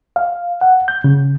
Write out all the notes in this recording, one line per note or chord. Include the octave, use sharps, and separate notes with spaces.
F5
F#5
G6
C#3